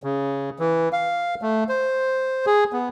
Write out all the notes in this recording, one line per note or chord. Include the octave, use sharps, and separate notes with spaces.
C#3
E3
F5
A3
C5
G#4
B3